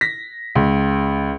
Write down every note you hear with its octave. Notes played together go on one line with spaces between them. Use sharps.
A#6 B6
C#2